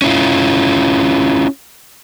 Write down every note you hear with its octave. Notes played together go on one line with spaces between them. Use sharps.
C#4 E4 F4